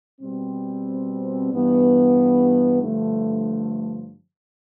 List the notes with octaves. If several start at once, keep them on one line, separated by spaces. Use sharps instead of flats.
B2 G3 C4
G2 E3 B3
G2 D3 F3 A3